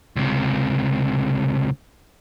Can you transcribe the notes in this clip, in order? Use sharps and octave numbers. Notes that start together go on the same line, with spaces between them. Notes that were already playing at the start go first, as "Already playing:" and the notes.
C#2 C3